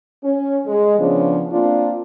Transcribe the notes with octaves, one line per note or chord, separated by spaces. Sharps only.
C#4
G#3
C#3 F3 B3 C#4 D4
A#3 C4 D4 F4